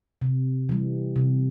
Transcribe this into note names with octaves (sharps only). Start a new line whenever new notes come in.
C3
E3 G3
C3